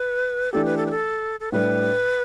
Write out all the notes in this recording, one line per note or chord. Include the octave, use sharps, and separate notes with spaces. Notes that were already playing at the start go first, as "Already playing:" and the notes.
Already playing: B4
E3 A3 D4 G4 A4
B4
A4
B4
A4
A4
A2 G3 D4 G4 B4